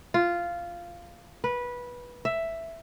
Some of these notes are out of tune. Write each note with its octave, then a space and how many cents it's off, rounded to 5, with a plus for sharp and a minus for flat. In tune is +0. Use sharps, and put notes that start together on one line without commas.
F4 -10
B4 -15
E5 +5